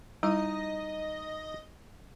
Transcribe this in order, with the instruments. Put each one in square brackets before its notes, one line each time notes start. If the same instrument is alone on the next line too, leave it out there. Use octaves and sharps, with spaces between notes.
[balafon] G3 E4 [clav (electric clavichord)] D#4 [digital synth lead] D#5